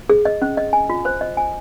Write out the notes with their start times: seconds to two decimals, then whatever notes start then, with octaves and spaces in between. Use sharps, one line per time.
0.09 G#4
0.25 D#5
0.42 C#4
0.57 D#5
0.73 G#5
0.90 F4
1.05 C5
1.21 D#5
1.37 G#5